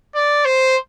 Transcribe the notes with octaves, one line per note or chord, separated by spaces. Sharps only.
D5
C5